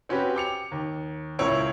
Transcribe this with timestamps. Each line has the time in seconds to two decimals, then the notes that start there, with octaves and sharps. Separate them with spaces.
0.09 C4 C#4 F#4 G4 B4
0.35 G5 D6 C#7 F7
0.72 D#2
1.39 C#2 A#2 E4 C#5 E6 D7